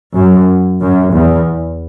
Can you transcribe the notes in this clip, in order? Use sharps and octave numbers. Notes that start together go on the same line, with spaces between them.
F#2
F#2
E2